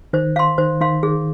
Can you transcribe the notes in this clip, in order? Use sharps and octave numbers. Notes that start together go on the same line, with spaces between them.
D#3 C5
F5 C6
D#3 C5
D#3 F5 C6
D#3 G#4